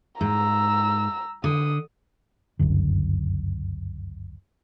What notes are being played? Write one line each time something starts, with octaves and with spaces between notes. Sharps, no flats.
G#2 A#5 E6
D3 D#6
G1 C#2 F#2 D3